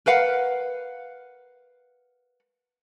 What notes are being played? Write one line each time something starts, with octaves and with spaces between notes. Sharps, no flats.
A#4 B4 F5 F#5